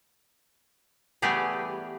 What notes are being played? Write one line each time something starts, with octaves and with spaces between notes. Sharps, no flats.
E3 G3 A3 B3 G4 G#4